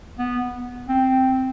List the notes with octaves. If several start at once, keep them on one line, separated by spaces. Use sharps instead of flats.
B3
C4